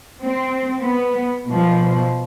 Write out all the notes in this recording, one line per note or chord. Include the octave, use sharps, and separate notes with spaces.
C4
B3
B2 F3